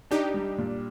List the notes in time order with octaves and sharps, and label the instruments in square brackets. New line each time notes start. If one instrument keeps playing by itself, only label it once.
[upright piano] D4 [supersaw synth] D#4 G4
[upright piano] G3
A#2